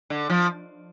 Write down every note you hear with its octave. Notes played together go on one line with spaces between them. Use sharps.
D3
F3